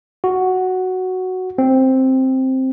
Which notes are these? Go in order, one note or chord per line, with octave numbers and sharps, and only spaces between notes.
F#4
C4